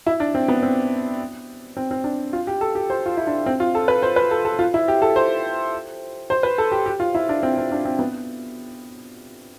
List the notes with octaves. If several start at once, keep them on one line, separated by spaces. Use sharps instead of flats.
E4
D4
C4
B3
C4
C4
C4
D4
F4
G4
A4
G4
C5
F4
E4
D4
C4
F4
A4
B4
C5
B4
A4
A4
F4
E4
G4
A4
C5
C5
B4
A4
G4
G4
F4
E4
D4
C4
C4
D4
C4
B3